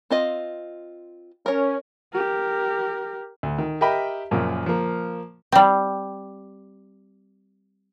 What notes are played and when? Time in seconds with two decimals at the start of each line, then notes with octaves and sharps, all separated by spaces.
0.10 C4 F4 D#5
1.46 C#4 A#4 C#5
2.13 G4 A#4
3.43 D2
3.59 D#3
3.81 G4 A#4 D#5 E5 G5 B5
4.31 F#2 A#2 C#3 F3
4.66 F3 A#3
5.52 G3 C4